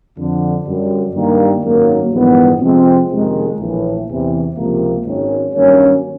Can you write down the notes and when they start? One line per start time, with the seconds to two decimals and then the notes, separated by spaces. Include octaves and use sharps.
0.17 F2 D3 F3
0.65 F#2 D3 G3
1.14 G2 D#3 G3 A#3
1.63 G#1 F#2 D#3 F#3 A#3
2.12 A#1 G#2 E3 G3 B3
2.60 F2 C3 F3 G#3 C4
3.10 F#1 F2 C3 D#3 G#3
3.59 A#1 A2 E3
4.07 E2 C3 E3
4.56 C#2 C3 F3 A#3
5.05 G#1 F#2 D#3 G#3 C#4
5.54 G2 D#3 F#3 A#3 C#4